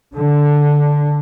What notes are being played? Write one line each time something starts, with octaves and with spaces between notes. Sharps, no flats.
D3